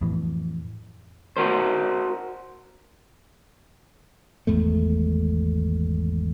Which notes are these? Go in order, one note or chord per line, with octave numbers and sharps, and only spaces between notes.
F2 A2 E3
F#4 A#4 C5
G#1 E2 G#2 A3